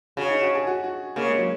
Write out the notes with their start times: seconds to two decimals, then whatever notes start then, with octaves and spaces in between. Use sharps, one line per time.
0.17 C#3 F#4
0.30 D#4
0.42 F#4
0.55 G#4
0.67 F#4
0.84 F#4
1.16 C#3 A#3
1.27 G#3
1.38 F#3